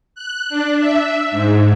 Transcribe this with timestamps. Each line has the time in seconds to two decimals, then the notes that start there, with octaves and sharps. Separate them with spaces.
0.15 F#6
0.49 D4
0.79 E5
1.31 G#2